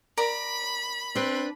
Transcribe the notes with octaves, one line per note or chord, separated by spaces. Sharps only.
A#4 D5 A#5 B5
C4 D4 B4